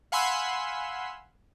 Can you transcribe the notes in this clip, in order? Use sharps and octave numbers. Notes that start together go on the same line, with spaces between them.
F5 F#5 G#5 B5 C6 E6